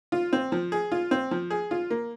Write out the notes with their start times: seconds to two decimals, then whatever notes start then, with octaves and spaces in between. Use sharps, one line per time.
0.12 F4
0.33 C4
0.52 F3
0.72 G#4
0.92 F4
1.11 C4
1.31 F3
1.50 G#4
1.71 F4
1.90 A#3